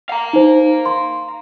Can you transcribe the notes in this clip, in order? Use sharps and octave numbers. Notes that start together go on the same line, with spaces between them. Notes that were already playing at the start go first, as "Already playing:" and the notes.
F5 A#5
D#4 C5
C6